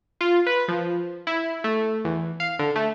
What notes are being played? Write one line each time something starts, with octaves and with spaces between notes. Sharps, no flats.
F4
B4
F3
E4
A3
E2
F5
D3
A3